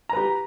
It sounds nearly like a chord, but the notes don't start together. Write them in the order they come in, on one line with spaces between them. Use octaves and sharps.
A#5 B4 G4